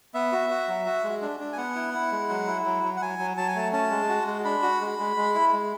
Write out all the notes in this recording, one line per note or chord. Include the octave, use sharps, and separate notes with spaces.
B3 E5
F#4
F#4
F#3
F#4
G#3
D4
D4
G#5
B3 F#5
E4
E4
G#3
F#3
E4
F#3
F#3
F#5
F#3 G#5
F#3
F#3 A5
G#5
A3 A5
C#4 A5
G#3
F#4
G#3
D4 B5
F#4
G#3
G#3
G#3
E4
G#3